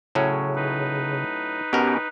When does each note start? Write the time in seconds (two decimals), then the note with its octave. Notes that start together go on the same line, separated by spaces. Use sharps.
0.15 A2 C#3 F#3 C#4
0.55 D#4 B4
1.73 B2 B3 C#4 G4 A#4